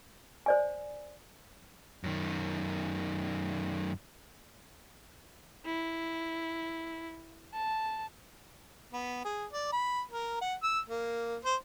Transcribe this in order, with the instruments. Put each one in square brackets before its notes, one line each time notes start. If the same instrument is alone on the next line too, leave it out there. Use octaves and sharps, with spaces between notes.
[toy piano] C5 D5 G#5
[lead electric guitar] F#2 D#3
[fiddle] E4
A5
[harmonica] B3
G#4
D5
B5
A#4
F#5
E6
A#3
C5